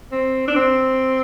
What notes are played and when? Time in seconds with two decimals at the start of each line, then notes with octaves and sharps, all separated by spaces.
0.11 C4
0.47 D4
0.56 C4